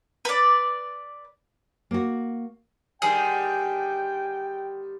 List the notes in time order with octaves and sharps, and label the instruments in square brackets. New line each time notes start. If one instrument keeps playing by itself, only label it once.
[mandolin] B4 D5
[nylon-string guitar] A#3 F#4
[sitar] D3 D#3 G3 [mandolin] G#4 [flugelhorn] G5